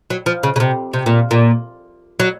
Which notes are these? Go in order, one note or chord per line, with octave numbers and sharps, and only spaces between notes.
F#3
F3
C#3
C#3
C3
C3
A#2
A#2
F#3